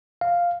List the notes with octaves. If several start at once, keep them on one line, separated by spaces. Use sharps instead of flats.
F5